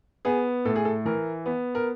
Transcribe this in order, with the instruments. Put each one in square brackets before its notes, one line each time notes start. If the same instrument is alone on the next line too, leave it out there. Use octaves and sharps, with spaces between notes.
[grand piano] B3 [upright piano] G#4
[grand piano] A2 [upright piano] A4
[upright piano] G#4
A4
[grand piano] E3 [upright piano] A#4
[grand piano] B3
[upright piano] A#4